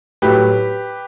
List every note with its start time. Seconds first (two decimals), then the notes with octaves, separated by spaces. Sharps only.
0.22 A2 F#3 G4 B4